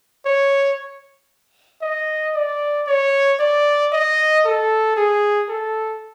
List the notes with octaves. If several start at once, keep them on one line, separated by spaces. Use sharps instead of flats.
C#5
D#5
D5
C#5
D5
D#5
A4
G#4
A4